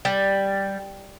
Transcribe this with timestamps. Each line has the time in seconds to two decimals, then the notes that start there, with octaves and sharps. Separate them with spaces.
0.05 G3